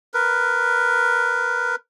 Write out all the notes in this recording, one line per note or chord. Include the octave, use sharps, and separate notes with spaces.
A#4 B4